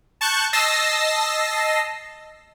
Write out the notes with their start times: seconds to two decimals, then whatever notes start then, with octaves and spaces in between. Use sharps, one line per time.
0.21 A5 C#6 F#6 G6
0.53 D#5 A5 E6 A#6 C7